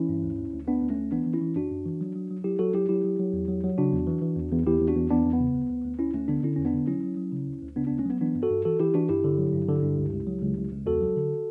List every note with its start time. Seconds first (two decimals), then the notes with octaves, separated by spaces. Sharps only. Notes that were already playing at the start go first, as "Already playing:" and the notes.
Already playing: E3 C#4 E4
0.09 G2
0.23 D2
0.39 D2
0.53 D2
0.68 D2 B3 D4
0.82 D2
0.90 A3 C#4
0.97 D2
1.12 E3 B3 D4
1.26 E3
1.34 C#4 E4
1.41 E3
1.56 F#2 D4 F#4
1.71 F#2
1.85 E3
2.01 F#3
2.15 F#3
2.30 F#3
2.44 F#3 E4 G4
2.59 F#3 F#4 A4
2.74 F#3 E4 G4
2.89 F#3 E4 G4
3.04 F#3
3.19 F#3
3.33 E2
3.48 F#3
3.64 F#3
3.78 C#3 D4 F#4
3.92 E2
4.07 E3
4.22 E3
4.36 E2
4.52 E2
4.66 E2 E4 G4
4.81 E2
4.88 D4 F#4
4.96 E2
5.10 E2 B3 D4
5.25 E2
5.33 B3
5.40 C#3
5.54 D2
5.70 D2
5.84 D2
5.99 D2 C#4 E4
6.14 D2 A3 C#4
6.28 D3 B3 D4
6.43 D3 C#4 E4
6.56 E2 C#4
6.65 B3 D4
6.74 D3
6.87 F#3 C#4 E4
7.03 F#3
7.17 F#3
7.32 C#3
7.47 D2
7.62 D2
7.76 C#3 B3 D4
7.87 D2 B3 D4
7.99 A3 C#4
8.05 F#3 B3
8.21 E3 B3 D4
8.35 G2
8.43 F#4 A4
8.50 G2
8.65 E3 F#4 A4
8.80 E3 E4 G4
8.94 E3 D4 F#4
9.09 G2 E4 G4
9.24 D3
9.38 F#3
9.54 G2
9.68 D3
9.83 G2
9.97 C#2
10.13 C#2
10.27 F#3
10.42 C#2
10.57 C#2
10.72 C#2
10.86 E2 F#4 A4
11.01 F#3
11.16 D3